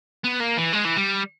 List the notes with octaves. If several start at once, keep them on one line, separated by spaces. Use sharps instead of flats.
B3
A#3
E3
G#3
E3
G3